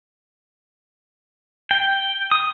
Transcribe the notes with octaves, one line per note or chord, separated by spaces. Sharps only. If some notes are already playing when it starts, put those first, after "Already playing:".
G5
D#6